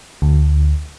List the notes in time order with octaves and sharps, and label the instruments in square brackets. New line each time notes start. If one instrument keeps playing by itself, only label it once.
[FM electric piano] D2